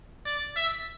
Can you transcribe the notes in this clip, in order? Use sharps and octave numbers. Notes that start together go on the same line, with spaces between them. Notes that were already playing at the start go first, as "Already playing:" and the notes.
D5
E5